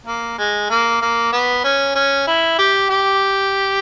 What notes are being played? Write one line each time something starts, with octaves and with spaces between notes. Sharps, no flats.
A#3
G#3
A#3
A#3
B3
C#4
C#4
E4
G4
G4